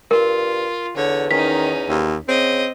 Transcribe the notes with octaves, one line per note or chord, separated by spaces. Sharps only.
G2 F4 A#4
E2 D3 C#5
D#3 C#4 D#4 B6
D#2
C#3 C4 D#5